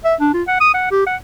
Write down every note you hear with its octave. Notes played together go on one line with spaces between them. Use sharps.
E5
D4
F4
F#5
D#6
F#5
G4
F#5